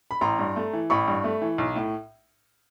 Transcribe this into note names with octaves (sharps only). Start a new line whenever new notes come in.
B5
A1 A#5 C6
G2
A3
E3
A1 B5 C#6
G2
A3
E3
B1
A2